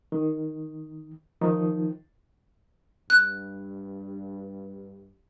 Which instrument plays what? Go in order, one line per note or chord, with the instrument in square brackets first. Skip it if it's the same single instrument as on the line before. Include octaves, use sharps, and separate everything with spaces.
[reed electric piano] D#3
D#3 F3 D#4
[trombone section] G2 [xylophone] F#6